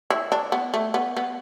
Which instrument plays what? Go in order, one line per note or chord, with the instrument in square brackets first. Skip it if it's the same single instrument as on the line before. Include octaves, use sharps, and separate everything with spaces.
[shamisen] E4
D4
B3
A3
B3
B3